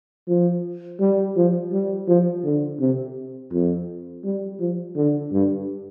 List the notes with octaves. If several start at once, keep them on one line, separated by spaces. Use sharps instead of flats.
F3
G3
F3
G3
F3
D3
C3
F2
G3
F3
D3
G2